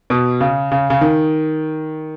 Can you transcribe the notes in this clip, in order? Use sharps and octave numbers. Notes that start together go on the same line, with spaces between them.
B2
C#3
C#3
C#3
D#3